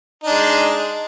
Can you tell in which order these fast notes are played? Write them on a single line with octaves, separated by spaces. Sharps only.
D#4 D4 G#3